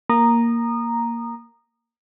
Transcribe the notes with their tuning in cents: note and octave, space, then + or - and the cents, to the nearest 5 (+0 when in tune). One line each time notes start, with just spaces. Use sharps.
A#3 +0 A#5 +0 D#6 -25